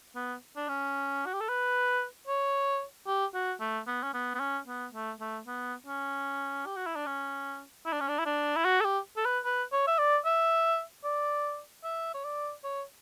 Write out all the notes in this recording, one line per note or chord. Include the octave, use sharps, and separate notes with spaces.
B3
D4
C#4
F#4
G4
A4
B4
C#5
G4
F#4
A3
B3
C#4
B3
B3
C#4
B3
A3
A3
B3
C#4
G4
F#4
E4
D4
C#4
E4
D4
C#4
D4
E4
D4
E4
F#4
A4
G4
A4
B4
B4
C#5
E5
D5
E5
D5
E5
C#5
D5
C#5